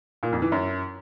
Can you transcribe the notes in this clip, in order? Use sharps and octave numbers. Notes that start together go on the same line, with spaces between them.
A#2
F2
E3
F#2